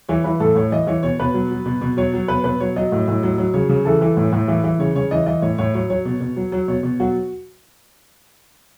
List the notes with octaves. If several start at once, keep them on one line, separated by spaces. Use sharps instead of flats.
E3 C#5
E3 B4
A2 A4
A2 C#5
E3 D#5
E3 C#5
B2 C#5
B2 B4
F#3
F#3
B2
B2
F#3 C#5
F#3
B2 B4
B2 B4
F#3 C#5
F#3 D#5
A2
A2
F#3
F#3
C#3 C#5
C#3
E3 A4
E3
A2
A2
E3
E3
C#3 C#5
C#3 C#5
E3 D#5
E3 D#5
A2 C#5
A2 C#5
F#3 C#5
F#3 C#5
B2
B2
F#3
F#3
B2 C#5
B2
F#3 F#4